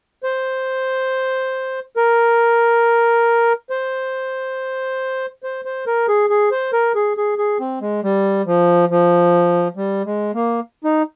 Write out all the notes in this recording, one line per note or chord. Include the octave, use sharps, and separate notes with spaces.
C5
A#4
C5
C5
C5
A#4
G#4
G#4
C5
A#4
G#4
G#4
G#4
C4
G#3
G3
F3
F3
G3
G#3
A#3
D#4